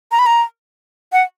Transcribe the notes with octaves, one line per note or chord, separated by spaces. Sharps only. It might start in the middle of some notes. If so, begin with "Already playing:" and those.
A#5
B5
A#5
F#5